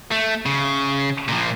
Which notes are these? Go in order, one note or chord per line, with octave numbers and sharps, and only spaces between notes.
A3
C#3
A#2 F3